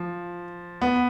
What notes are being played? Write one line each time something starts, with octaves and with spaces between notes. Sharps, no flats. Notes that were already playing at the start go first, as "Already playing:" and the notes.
Already playing: F3
B3